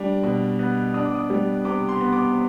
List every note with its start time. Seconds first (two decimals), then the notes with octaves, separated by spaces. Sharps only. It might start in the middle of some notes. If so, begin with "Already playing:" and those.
Already playing: G3 D4
0.23 B2
0.59 B3
0.94 D4 D#6
1.05 D6
1.15 D#6
1.30 G3
1.65 C3 D6
1.89 C6
2.00 B3
2.13 D6